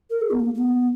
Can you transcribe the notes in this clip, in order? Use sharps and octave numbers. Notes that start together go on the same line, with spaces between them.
A#4
G#4
B3
A#3
A#3
B3